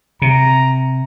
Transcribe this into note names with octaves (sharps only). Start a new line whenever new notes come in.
C3 A#5